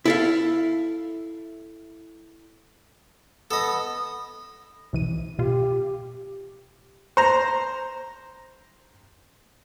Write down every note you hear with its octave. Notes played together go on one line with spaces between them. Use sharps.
E4 A4 F5
B3 A4 D#5
C2 E3 D#7
B2 F4 G4
C5 A#5